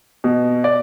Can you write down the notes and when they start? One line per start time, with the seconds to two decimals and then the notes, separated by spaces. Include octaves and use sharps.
0.24 B2
0.64 D5